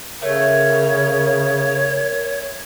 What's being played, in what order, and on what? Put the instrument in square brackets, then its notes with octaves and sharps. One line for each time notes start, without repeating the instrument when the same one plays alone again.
[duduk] C#3 [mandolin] A3 [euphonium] A#4 [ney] C#5